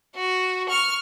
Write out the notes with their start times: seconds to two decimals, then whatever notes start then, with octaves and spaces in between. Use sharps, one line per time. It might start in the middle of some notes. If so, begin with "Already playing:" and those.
0.15 F#4
0.69 C#6 F6